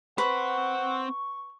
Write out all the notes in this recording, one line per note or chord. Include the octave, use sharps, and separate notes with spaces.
C4 B4 C5 F#5 C#6